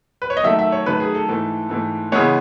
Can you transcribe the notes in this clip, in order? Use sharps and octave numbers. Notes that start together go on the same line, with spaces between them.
B4
C#5
D#5
F#2 D#3 A3 E5
E5
C#5
F#2 D#3 A3 B4
G#4
A4
G#2 E3 A3
G#2 E3 A3
C#3 E3 G#3 B3 C#5